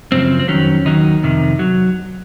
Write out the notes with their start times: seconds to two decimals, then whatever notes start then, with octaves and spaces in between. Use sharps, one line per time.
0.12 F#2 C#3 F3 C4
0.39 C4
0.48 F2 D#3 F#3 C#4
0.85 D#2 D#3 F#3 D#4
1.23 F2 C3 D#3
1.59 F#3